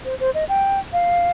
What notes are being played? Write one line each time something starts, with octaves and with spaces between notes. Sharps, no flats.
C5
C5
D#5
G5
F5